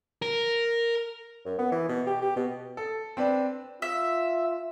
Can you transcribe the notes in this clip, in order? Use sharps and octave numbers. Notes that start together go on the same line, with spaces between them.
A#4
F#2
B3
E3
B2
G4
G4
B2
A4
C4 D4 B4
F4 E5